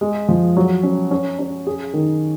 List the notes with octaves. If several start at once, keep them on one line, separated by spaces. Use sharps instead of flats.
G#3
F3
F#3
C#4
C#4
C#4
G#4
D#3